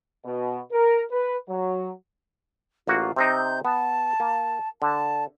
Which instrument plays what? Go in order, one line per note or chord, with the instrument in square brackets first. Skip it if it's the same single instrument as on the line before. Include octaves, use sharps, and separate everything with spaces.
[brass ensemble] B2
A#4
B4
F#3
[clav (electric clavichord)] A1 A#3 F#4 [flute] F4
[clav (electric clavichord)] C3 C4 D#4 [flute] G6
[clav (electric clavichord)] B3 [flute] A5
[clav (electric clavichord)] A#3
[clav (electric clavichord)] D3 [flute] A5